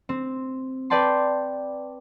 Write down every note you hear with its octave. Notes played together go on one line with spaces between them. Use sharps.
C4
B4 D5 G5 A5 C6